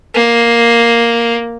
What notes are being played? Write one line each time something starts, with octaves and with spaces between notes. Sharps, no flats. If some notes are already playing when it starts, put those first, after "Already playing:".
A#3